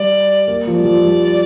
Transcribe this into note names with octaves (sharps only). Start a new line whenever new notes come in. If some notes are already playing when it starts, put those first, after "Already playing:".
Already playing: G3 D5
A#3
F3
G3 D5
F3
G3